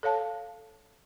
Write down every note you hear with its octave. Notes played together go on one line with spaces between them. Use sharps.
A4 C#5 F5 A5